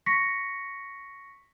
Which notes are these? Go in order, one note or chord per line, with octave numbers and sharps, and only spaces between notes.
C#6 A#6 B6 C#7